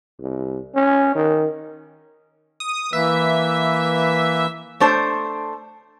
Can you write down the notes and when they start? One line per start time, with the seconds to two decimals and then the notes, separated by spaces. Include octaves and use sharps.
0.20 C2
0.75 C#4
1.15 D#3
2.60 D#6
2.93 E3 A#3 B4 E5
4.80 A3 D4 C5